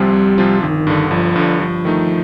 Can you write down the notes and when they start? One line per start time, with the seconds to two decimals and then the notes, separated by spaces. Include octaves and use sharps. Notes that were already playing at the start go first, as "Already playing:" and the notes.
Already playing: C2 C3 F3 G3 C4 F4
0.13 C2
0.38 C3 F3 C4 F4
0.62 G1 D#3
0.87 G2 D3
1.11 G1 F3
1.36 G2 D3
1.60 G2 F3
1.85 D#3 A3 D#4